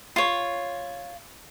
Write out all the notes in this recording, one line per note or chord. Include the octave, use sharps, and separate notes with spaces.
F4 C#5